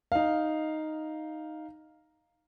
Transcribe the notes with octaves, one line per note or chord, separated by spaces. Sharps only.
D#4 F5